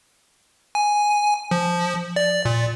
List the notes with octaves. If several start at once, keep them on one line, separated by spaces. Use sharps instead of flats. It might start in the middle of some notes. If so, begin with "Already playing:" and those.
G#5
F3
D5
A#2